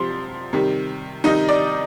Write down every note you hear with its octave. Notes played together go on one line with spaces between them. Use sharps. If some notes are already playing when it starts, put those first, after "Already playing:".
Already playing: C3 F3 C6
C3 D#3 G3
C3 D#3 G3 D#4 D#5
D5